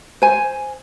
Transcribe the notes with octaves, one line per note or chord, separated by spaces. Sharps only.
C5 G#5